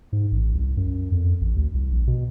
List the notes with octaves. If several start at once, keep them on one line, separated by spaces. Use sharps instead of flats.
G#2
A1
C2
F#2
F2
A1
D2
C2
A#1
B2